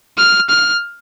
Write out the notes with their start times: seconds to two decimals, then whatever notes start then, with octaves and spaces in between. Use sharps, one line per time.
0.18 F6
0.50 F6